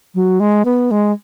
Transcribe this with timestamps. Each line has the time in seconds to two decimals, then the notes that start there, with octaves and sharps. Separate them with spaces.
0.15 F#3
0.40 G#3
0.65 B3
0.91 G#3